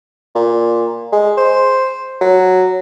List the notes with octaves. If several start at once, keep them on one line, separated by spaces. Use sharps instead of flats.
A#2
G#3
C5
F#3